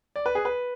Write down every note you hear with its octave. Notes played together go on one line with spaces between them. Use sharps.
D5
B4
G#4
B4